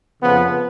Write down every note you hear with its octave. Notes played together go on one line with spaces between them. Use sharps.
F2 C#3 F3 A#3 B3